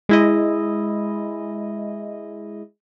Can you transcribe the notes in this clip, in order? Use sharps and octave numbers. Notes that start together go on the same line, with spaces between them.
G#3 E4 D#5